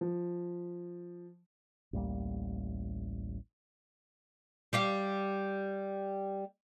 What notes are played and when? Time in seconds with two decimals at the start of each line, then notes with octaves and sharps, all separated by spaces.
0.01 F3
1.93 A1 D2 G3 A#3
4.73 G3 G4 F5